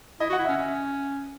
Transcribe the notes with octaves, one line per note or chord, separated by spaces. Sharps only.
E4 D#5
F#4
F#5
E4
C#4 E5
C#4